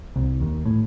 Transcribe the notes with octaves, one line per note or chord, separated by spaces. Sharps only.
C2
D#2
A2